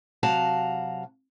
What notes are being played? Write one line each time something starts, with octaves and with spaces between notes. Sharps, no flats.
C3 F#3 F#4 F5 A5